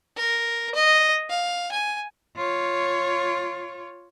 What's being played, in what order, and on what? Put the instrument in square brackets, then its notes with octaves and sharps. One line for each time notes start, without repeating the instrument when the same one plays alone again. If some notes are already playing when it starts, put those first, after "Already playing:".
[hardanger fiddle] A#4
D#5
F5
G#5
[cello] F4 C#5